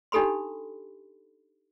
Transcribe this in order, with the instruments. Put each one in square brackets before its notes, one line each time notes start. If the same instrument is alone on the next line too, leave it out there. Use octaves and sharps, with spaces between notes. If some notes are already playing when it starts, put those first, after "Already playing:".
[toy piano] D4 D#4 G4 A4 B5 C6